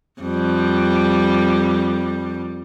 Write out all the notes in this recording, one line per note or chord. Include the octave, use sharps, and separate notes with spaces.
F2 G3